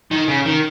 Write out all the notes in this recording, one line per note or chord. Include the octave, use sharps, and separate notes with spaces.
D#3
C#3
D#3